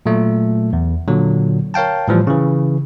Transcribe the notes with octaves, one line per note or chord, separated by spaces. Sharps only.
A#2 F#3 A3
E2
A#2 D3 F#3
A#4 C#5 F5 G5 A5
A2 E3 F3 G3
C#3 E3